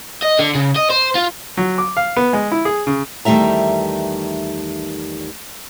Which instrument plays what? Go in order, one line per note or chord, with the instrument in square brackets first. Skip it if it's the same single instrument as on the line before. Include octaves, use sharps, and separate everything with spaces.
[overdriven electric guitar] D#5
D3
C#3
D#5
C5
F4
[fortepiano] F#3
D6
F5
B3
G#3
E4
G#4
C#3
[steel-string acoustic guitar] E2 D#3 G3 A3 E5 A#5